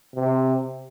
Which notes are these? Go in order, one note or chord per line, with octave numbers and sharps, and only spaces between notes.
C3